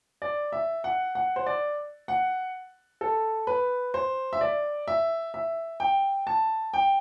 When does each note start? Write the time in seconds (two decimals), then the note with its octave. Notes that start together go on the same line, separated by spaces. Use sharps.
0.22 D5
0.52 E5
0.84 F#5
1.15 F#5
1.36 C5
1.46 D5
2.08 F#5
3.01 A4
3.47 B4
3.94 C5
4.33 E5
4.41 D5
4.88 E5
5.34 E5
5.80 G5
6.27 A5
6.73 G5